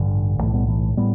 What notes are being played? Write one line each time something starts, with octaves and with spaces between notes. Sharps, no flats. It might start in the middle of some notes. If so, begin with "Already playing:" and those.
Already playing: A1 G2 D3
B1 A2 E3 A3
G3 B3
E3 A3
A2 G3 B3